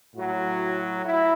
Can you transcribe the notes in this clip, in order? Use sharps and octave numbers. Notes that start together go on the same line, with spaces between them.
A2 F#3 F#4
E4